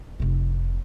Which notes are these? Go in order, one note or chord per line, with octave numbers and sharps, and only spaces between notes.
F1 C3